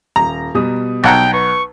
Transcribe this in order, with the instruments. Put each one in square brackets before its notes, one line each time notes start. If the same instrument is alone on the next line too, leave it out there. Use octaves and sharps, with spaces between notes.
[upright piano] D#1 [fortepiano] A#5
[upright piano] B2 G3 D#6
[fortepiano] B1 F#5 A#5 [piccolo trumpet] G5
[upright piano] B4 [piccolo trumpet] C#6